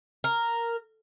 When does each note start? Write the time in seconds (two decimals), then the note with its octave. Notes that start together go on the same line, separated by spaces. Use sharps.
0.24 A#4